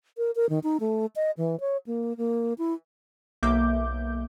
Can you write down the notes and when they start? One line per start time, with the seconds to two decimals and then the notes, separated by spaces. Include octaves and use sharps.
0.18 A#4
0.36 A#4
0.49 D#3
0.64 D#4
0.80 A3
1.16 D#5
1.37 E3
1.60 C#5
1.87 A#3
2.17 A#3
2.58 E4
3.43 B1 A#3 E5 D6 G6